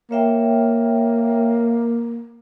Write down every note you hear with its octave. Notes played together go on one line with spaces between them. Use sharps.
A#3 C#5 E5 G5